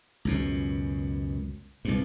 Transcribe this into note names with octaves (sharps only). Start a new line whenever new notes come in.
C#2 F#2 B2
C2 G2